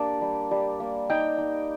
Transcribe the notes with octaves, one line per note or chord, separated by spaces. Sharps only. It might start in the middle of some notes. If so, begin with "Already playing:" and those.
Already playing: A#3 D4 G4 D5
G3
G3
A#3
D#4 G5
D#4